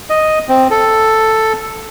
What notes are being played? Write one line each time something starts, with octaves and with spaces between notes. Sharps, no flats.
D#5
C4
A4